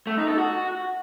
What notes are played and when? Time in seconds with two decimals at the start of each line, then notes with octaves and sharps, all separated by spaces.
0.07 A3
0.18 D#4
0.28 A4
0.39 F#4